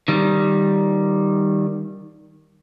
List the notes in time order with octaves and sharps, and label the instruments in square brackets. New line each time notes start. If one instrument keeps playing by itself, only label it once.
[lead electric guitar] D#3 G3